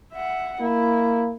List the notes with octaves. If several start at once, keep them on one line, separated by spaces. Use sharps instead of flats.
E5 F#5
A#3 E4